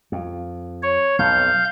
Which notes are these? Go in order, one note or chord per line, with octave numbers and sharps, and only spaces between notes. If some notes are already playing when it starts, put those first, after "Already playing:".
F2
C#5
B1 F2 F5 G6